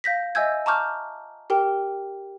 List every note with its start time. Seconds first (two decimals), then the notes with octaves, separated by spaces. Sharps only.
0.04 F5 G6 A#6 B6
0.35 D#5 E5 G#5 E6 G6 G#6
0.66 A5 A#5 C#6 D6 F6 G6
1.50 G4 A#4 G5